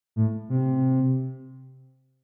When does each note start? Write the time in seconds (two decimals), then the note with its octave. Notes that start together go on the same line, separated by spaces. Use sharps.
0.16 A2
0.49 C3